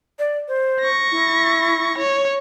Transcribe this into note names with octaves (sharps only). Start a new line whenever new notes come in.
D5
C5
C#6 A#6
E4
C#5